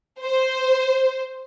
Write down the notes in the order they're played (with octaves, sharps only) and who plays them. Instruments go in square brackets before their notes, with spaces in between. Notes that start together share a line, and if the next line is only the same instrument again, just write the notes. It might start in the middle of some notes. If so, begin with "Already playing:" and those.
[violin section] C5